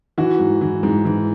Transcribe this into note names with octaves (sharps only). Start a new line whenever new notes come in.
E3 F#4
G#2
E3
G#2
E3